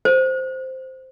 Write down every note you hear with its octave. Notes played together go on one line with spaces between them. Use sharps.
C5